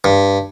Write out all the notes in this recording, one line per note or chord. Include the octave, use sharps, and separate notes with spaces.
G2